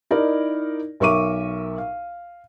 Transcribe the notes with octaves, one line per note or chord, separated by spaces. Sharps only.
D#4 E4 A#4 D5
B1 A#4 E5 C#6 D6 D#7
F5